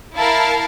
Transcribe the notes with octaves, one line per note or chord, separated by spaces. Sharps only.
E4 A#4 F5 A5